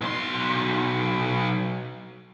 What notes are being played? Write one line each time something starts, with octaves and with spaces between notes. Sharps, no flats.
B1 C6